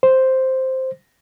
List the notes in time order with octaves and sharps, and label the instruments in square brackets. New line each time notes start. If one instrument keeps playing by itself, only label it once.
[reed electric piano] C5